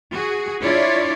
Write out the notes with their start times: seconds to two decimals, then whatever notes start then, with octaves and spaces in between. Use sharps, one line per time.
0.14 F#4 G#4
0.63 D4 E4 F4 C#5 D5